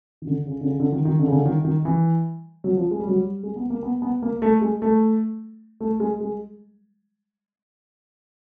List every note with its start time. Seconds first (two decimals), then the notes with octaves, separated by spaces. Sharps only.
0.22 D#3
0.27 D3
0.47 C#3
0.61 D3
0.66 C#3
0.80 D3
0.92 D#3
1.05 D#3
1.19 D3
1.27 C#3
1.33 D3
1.45 D#3
1.65 D#3
1.85 E3
2.64 F#3
2.77 F3
2.91 G#3
3.00 G3
3.07 F#3
3.16 G3
3.43 G#3
3.56 B3
3.70 A#3
3.83 B3
4.02 B3
4.22 A#3
4.42 A3
4.61 G#3
4.82 A3
5.81 A3
6.00 G#3
6.20 G#3